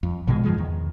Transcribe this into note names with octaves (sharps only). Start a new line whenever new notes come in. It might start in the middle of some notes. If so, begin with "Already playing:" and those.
F2
A#1 B2 F3 G#3
G2 D#3 F3 G#3
E2 D#3